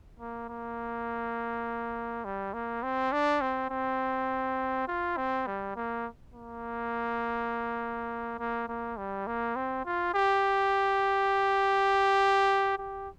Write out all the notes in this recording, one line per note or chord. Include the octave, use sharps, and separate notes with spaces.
A#3
A#3
G3
A#3
C4
D4
C4
C4
F4
C4
G3
A#3
A#3
A#3
A#3
G3
A#3
C4
F4
G4
G4